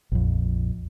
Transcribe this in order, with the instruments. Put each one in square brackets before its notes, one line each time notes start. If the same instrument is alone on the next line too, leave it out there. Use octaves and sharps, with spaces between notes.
[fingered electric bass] A#1 F2